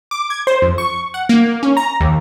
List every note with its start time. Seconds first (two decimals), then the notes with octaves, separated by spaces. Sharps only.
0.11 D6
0.30 G#6
0.47 C5
0.62 F2
0.78 C#6
1.14 F#5
1.29 A#3
1.63 C#4
1.77 A#5
2.00 D#2